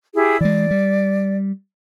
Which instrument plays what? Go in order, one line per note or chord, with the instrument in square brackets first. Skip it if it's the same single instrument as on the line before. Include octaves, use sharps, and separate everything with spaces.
[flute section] E4 G4 G#4
[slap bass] E3 G#3 [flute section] D5
[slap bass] G3